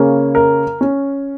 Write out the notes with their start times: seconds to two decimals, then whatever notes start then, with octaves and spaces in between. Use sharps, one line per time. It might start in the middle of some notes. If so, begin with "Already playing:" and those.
Already playing: C#3 A#3 C#4
0.35 A#4
0.81 C#4